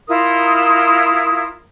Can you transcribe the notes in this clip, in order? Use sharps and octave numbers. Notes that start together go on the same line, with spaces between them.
E4 F4 A#4 D#6